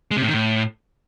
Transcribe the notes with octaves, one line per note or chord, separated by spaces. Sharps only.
G#3
C3
A2
D#3
A2